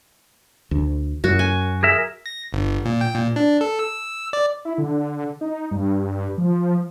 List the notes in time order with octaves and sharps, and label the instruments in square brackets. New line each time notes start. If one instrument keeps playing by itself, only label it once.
[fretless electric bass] D2
[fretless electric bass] F#2 [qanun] F#4
[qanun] G#5
[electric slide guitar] G#4 A#4 E5
[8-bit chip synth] A#6
G1
A#2
G5
A#2
D4
A4
E6
D5
[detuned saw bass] E4
D3
D#4
G2
F3